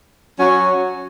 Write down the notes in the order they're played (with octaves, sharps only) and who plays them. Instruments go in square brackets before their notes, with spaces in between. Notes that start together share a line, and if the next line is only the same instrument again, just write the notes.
[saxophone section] F#3 C#4 F#4